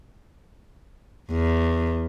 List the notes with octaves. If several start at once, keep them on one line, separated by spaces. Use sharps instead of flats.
E2